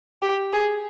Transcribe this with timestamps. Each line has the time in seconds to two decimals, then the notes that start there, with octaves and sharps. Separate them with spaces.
0.22 G4
0.53 G#4